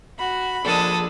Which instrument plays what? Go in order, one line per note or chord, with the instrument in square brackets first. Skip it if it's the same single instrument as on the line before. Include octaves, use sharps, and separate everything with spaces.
[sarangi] F#4 [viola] B5
[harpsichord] A#1 G#3 [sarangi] D4 [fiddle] A4 D#6